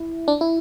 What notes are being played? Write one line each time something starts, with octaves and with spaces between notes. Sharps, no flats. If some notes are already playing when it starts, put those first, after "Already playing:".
Already playing: E4
D4
E4